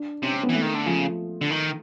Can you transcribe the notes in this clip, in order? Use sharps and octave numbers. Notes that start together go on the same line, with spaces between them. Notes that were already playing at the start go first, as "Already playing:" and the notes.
Already playing: D4
C3 C#4
C4
B3
E3
A3
D#3
D3
C#3 F3
D3
D#3